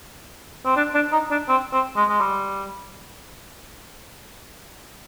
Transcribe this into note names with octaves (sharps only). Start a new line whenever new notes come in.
C4
D4
D4
D#4
D4
C4
C4
G#3
G#3
G3